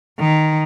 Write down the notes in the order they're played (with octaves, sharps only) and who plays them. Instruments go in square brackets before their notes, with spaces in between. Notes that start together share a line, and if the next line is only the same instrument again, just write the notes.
[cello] D#3